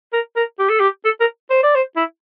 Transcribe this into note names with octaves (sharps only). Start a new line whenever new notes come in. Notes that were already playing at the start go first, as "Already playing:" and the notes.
A#4
A#4
G4
A4
G4
A4
A#4
C5
D5
C5
E4